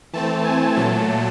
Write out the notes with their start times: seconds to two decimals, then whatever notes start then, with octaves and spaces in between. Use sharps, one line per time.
0.13 E3 A3 C4 A5
0.45 G#5
0.76 A#2 F#3 A3 A5